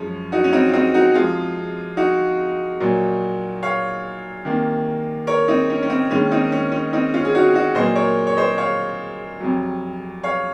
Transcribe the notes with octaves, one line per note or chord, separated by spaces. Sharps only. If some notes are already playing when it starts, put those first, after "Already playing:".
Already playing: F#2 F3 G#3 C#4
D#4 F#4
C#4
C4 D#4
F4
C4 D#4
D#4 F#4
C3 F3 G#3 F4 G#4
D#4 F#4
A#2 F#3 A#3
C#5 F5
C3 D#3 A#3
A#4 C#5
C4 D#4
C#4
C#4
C4
G#2 D#3 A#3 C#4
C4 D#4
C#4
C#4
C4 D#4
C#4 F4
G#4
D#4 F#4
D#4 F#4
A#2 F#3 A#3 C5 D#5
A#4 C#5
C#5
C5 D#5
C#5 F5
F2 C3 F#3
C#5 F5